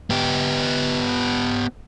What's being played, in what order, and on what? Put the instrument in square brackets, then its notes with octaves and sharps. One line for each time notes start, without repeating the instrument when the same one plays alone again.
[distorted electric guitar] B3 G4